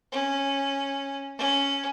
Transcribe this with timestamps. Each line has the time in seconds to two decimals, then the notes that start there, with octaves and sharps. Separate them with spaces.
0.12 C#4
1.38 C#4